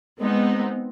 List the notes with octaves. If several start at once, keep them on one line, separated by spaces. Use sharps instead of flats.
G#3 B3 C4 D#4